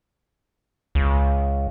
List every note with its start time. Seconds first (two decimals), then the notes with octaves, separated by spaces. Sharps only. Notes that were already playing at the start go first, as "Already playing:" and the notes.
0.95 C#2